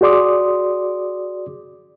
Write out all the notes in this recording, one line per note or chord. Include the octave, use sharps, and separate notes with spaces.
F#4 G#4 D5 C6 D6 D#6